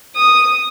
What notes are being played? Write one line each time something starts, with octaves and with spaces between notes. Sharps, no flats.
D#6